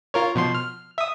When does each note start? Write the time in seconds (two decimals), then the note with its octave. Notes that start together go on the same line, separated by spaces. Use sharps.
0.14 F4 A#4 C#5
0.35 B2 F3 C6
0.55 F6
0.98 E5 D#6